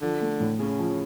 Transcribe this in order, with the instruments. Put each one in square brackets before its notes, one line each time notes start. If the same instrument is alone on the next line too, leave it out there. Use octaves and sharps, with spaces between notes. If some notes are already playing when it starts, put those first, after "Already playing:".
[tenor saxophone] D3 [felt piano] F3
[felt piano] A3
A2
[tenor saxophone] C#3 [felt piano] C#4
[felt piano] F3